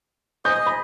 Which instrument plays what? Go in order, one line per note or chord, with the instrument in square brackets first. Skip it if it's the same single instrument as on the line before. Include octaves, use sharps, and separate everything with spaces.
[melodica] G#4 D#5 [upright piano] G6
[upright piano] B5